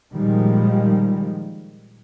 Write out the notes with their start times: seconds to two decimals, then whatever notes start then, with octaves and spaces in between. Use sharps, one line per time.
0.12 A#2 D#3 F3 G3 G#3